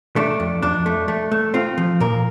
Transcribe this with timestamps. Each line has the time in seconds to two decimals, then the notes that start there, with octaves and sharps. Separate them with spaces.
0.16 A3 D4
0.40 F2
0.62 F2 D4
0.86 A3
1.08 A3
1.32 A3
1.54 C4 F4
1.78 F3
2.00 A#2 A#4